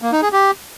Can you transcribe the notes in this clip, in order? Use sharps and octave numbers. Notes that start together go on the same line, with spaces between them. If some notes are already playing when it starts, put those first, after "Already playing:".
A#3
D#4
G#4
G4